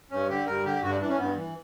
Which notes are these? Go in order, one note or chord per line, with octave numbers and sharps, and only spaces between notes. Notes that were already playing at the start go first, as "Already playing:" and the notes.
G2 C#4
D3 G4
G2 A#4
D3 G4
G2 F#4
D4
E3 D4
C#4
G2 B3
E3